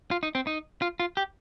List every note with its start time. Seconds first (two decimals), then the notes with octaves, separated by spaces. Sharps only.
0.11 F4
0.23 D#4
0.35 C4
0.47 D#4
0.82 F4
1.00 F4
1.17 G4